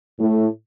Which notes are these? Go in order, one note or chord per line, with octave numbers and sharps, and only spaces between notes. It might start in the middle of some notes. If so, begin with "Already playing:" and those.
A2